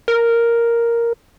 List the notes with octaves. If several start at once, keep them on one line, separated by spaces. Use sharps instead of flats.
A#4